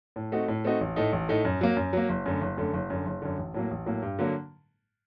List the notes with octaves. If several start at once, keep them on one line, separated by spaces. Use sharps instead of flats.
A2
A3 C4 D#4 F#4
A2
A3 C4 D#4 F#4
A1
A2 A3 D#4
A1
A2 A3 D#4
F#2
F#3 A#3
F#2
F#3 A#3
F#1
F#2 D3 A3
F#1
F#2 D3 A3
F#1
F#2 D3
F#1
F#2 D3
A1
A2 F#3 A#3
A1
A2 F#3 A#3
G2
D3 F#3 A#3